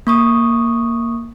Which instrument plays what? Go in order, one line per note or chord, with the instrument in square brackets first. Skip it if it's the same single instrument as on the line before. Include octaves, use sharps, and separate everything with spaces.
[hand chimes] A#3 C#6 D#6